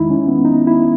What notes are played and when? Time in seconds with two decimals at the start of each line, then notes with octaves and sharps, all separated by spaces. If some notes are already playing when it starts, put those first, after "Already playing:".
Already playing: E2 D#3 G#3 D#4 E4
0.10 C#4
0.28 B3
0.45 D#4
0.67 E4